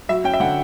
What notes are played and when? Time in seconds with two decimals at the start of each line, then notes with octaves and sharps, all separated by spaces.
0.09 F#3 E5
0.24 C#4 G5
0.34 E5
0.40 D3 F#5